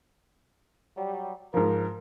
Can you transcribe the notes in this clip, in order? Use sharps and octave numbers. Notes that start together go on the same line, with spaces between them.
F#3 G3
G#2 F3 A#4